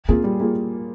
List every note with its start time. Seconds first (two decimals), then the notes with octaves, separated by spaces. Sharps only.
0.08 A#3 C4 F4 G#4
0.24 G3
0.40 A#3 F4 G#4